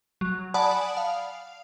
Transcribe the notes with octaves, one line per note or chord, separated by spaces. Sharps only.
F#3
D5 F#5 G#5 A5 B5 D#6
F5